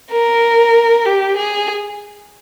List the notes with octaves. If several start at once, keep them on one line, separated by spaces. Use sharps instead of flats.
A#4
G4
G#4